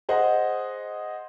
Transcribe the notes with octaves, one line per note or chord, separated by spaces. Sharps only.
G#4 C5 D#5 F#5